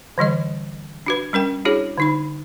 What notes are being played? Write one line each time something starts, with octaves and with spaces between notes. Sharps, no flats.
D3 E3 G3 D#5
D4 F#4 B4
G3 C#4 A#4 G5
D4 E4 F#4 G#4 C#5
D3 D#4 B5